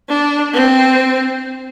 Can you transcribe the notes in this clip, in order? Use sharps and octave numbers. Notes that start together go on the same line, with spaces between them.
D4
C4